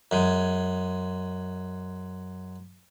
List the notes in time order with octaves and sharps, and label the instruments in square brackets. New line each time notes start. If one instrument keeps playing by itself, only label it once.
[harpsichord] F#2 G#3